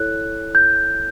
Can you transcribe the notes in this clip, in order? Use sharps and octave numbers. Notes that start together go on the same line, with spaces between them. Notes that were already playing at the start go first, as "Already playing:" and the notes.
Already playing: E4 A4 C#5 F#6
G6